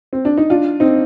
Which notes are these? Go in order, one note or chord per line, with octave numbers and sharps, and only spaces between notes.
C4
D4
D#4
D4 F4
C4 D#4